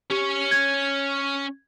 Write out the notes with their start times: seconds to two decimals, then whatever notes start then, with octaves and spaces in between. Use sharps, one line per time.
0.11 C#4 G4 C#5
0.51 G#6